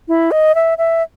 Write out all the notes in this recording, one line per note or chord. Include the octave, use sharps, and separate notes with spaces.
E4
D#5
E5
E5